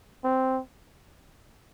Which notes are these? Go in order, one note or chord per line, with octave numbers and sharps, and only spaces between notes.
C4